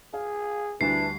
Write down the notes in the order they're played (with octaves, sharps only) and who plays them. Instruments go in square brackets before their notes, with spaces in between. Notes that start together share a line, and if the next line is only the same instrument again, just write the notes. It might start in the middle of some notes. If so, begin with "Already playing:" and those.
[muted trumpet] G#4 [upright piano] F5
[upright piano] D2 G3 [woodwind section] E3 D4 [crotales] C7